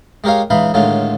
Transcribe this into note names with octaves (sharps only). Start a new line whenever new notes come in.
G#3 G4 A#4 C#5 F5
C#2 E3 D#4 F5 B5
A2 D3 D#3 G#3 C#4 F4